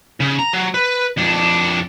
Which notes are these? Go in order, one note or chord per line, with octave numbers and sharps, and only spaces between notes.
C#3
A#5
F#3
B4
F2 D4